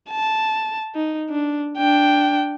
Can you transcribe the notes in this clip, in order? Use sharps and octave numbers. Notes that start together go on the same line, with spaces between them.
A5
D#4
D4
D4 G5